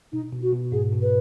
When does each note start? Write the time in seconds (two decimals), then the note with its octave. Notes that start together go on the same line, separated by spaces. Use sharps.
0.12 B2 D#4
0.33 B2
0.42 F#4
0.53 B2
0.72 G#2 G#4
0.92 B2
1.02 B4